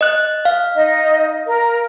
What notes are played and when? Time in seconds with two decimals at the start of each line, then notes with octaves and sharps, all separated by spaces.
0.01 D#5 F#6
0.45 F5
0.76 D#4 D#5
1.47 A#4